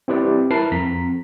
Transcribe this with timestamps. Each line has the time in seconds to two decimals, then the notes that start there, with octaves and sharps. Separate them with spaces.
0.08 C4 E4 G4 B4 D5
0.51 E4 A#4 B4 A5 C7
0.72 F2 A#5 B6